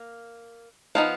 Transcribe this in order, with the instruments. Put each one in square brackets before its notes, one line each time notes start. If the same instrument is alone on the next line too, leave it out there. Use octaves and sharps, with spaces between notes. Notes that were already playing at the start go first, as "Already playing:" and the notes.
Already playing: [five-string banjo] A#3
F3 B3 D#4 F5